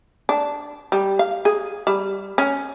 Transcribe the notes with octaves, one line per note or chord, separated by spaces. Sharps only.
D4
G3
F5
G#4
G3
C#4